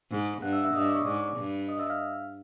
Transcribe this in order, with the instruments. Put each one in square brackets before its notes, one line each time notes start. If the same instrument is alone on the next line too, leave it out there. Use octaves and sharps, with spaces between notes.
[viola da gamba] G#2
[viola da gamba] G2 [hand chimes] F#5 F#6
[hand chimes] E5 E6
E5 E6
[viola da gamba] G2 [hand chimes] D#5 D#6
[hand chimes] D5 D6
C#5 C#6
[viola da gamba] G#2 [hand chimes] D5 D6
[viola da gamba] G2
[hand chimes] D#5 D#6
E5 E6
F5 F6